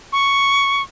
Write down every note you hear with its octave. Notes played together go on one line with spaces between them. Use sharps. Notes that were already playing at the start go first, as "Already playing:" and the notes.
C#6